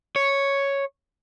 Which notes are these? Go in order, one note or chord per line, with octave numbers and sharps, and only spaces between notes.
C#5